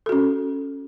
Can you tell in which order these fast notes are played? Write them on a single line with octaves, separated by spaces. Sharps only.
A4 F#4 C#4